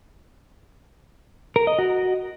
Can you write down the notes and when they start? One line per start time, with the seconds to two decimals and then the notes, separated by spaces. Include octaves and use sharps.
1.56 A#4
1.67 D#5
1.79 F#4